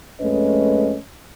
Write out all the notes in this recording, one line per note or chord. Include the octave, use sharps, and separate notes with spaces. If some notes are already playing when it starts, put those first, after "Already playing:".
F2 G#3 A3 C#4 B4 D#5